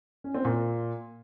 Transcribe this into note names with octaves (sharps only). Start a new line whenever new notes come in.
C#4
C4
A#2